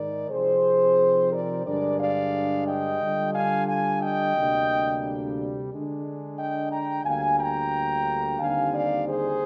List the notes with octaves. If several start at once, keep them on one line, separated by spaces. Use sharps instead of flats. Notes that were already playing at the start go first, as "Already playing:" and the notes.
Already playing: G#2 D#3 G#3 D#4 A#4 D5
C3 F3 C4 D#4 G#4 C5
A#4 D5
G2 D3 G#3 D4 A#4 D5
D5 F5
D#5 G5
D3 G3 D4 F4
F5 G#5
F5 G#5
D#5 G5
D2 C3 G3 A#3 D4
D3 G#3 D4
D#5 G5
G5 A#5
D2 D3 G3 A#3 F5 G#5
G5 A#5
D#2 D3 G3 C4 D#4 F5 G#5
D5 F5
G#4 C5